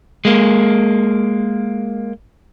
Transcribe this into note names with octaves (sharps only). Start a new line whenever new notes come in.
G#3 A#3